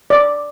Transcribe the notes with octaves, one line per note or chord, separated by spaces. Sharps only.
D5